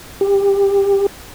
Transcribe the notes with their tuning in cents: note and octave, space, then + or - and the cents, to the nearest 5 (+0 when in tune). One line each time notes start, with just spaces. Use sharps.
G4 +20